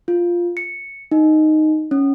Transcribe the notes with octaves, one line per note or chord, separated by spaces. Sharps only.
F4
C#7
D#4
C#4